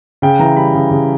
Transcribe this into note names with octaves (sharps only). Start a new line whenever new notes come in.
C#3 G5
E3 A#5
G3 B5
C#3
C#3